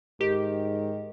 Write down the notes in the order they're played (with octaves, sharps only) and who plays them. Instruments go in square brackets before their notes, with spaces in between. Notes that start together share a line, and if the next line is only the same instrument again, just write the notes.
[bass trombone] G#2 [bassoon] D#3 [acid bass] G4